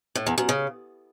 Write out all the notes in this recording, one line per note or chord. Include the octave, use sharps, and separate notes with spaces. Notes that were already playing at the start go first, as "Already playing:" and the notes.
A2
E2
F#2
C#3